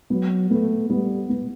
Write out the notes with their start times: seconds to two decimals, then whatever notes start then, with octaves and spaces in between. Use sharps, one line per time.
0.10 F#3 B3
0.49 A3 B3
0.90 G3 B3
1.30 B3